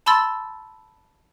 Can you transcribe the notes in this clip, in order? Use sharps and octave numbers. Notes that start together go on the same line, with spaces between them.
A5 B5 C6 E6 A6